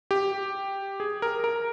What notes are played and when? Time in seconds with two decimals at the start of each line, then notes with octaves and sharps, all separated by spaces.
0.11 G4
1.00 G#4
1.22 A#4
1.44 A#4